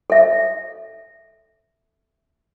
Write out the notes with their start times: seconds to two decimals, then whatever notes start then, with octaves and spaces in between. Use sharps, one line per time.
0.10 A4 E5